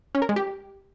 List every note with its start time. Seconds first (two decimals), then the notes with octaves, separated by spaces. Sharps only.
0.15 C#4
0.22 A#4
0.29 G#3
0.36 G4